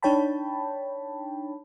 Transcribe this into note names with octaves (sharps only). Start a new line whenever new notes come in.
D4 D#4 C#5 G5 A5 B5